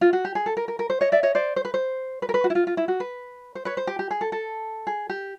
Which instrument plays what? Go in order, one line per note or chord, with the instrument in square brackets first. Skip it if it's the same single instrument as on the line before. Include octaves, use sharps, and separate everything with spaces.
[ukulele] F4
F#4
G4
G#4
A4
A#4
A#4
A#4
C5
C#5 D#5
D5 E5
C#5 D#5
C5 D5
C5
B4
C5
B4
A#4
B4
F#4
E4
F4
F4
E4
F#4
B4
C5
B4 C#5
C5
G4
G4
G#4
A4
A4
G#4
G4